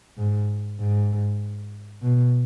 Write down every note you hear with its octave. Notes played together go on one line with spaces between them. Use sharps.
G#2
G#2
B2